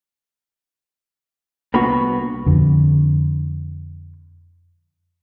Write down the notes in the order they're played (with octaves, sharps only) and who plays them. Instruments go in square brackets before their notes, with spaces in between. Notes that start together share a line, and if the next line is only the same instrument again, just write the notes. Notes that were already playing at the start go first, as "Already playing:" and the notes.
[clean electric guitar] C2 D4 B5 [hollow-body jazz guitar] A#3 B3 F#4
[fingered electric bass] F2 D3